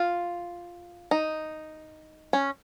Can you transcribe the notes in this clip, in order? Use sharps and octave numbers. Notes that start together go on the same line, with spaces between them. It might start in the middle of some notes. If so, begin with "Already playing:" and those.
Already playing: F4
D#4
C#4